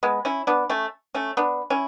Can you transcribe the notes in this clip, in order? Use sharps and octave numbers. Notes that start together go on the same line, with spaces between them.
G#3 B3
C#4 E4
B3 D4
A3 C#4
A3 C#4
B3 D4
C#4 E4